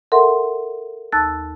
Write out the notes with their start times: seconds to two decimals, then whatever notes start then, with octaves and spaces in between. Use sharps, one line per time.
0.12 A4 A#4 E5 F#5 C6
1.12 D#2 A5 E6 F#6 A6